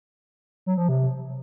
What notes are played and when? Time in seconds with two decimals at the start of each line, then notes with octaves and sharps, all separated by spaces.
0.66 F#3
0.77 F3
0.89 C3